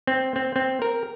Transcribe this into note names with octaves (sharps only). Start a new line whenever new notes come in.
C4
C4
C4
A#4